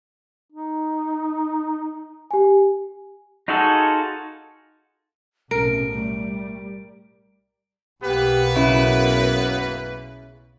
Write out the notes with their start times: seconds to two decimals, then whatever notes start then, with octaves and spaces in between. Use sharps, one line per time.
0.52 D#4
2.31 G4 G#5
3.48 D#4 F4 F#4 G#4 A4
5.51 B1 A2 C3 C#4 A#4 D7
5.92 G3 A3
8.03 B1 A#3 B3 G4 B4
8.55 F#2 C#3 E4